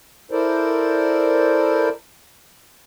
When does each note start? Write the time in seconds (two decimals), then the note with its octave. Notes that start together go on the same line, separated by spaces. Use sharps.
0.31 E4 A4 A#4 C5 D5